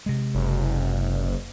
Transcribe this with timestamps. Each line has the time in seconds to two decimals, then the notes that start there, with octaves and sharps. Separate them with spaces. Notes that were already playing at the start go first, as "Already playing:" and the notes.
0.06 C3 G#3
0.34 F#1